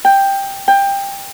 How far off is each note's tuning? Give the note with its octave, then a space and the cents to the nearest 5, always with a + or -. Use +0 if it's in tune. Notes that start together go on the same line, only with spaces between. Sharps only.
G5 +10
G5 +20